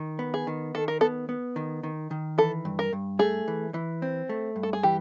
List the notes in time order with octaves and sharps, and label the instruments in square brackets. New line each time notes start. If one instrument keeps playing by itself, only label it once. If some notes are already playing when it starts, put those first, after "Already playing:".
Already playing: [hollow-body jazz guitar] D#3
B3
[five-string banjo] G#4
[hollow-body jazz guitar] D#3
[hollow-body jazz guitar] D#3 [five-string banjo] A4
[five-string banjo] A#4
[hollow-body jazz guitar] B3 [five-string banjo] A4
[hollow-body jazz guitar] B3
D#3
D#3
D#3
[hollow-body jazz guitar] E3 [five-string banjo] A4
[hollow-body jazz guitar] G2
[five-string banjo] A#4
[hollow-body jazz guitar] G2
[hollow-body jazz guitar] A3 [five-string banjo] G#4
[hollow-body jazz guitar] E3
E3
C4
A3
G2
[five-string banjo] A4
G#4
[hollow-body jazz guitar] E3 [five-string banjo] G4